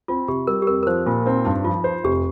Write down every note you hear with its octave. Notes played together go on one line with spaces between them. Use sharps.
C4 F4
C3 G4
G3 A#4
G4
F2 A#4
A#4
F3 C5
A#2 F4
C4 D#4
G2 D#4
F3 F4
C5
F1 G4